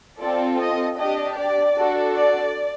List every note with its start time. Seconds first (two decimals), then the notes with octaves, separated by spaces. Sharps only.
0.19 C4 F4 A4 D5
0.58 D#5
0.97 D4 G4 D#5
1.36 D5
1.75 D4 F#4 A4
2.14 D5